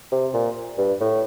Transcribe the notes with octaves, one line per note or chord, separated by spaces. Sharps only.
C3
A#2
G2
A2